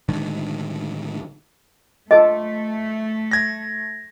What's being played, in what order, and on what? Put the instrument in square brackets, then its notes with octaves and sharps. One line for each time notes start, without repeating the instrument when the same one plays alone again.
[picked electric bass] A1 D3 D#3 G#3
[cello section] A3 [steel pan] F4 A4 D6 [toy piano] D#5
[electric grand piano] G#6 A#6